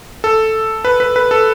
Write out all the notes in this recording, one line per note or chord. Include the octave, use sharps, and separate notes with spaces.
A4
B4
B4
B4
A4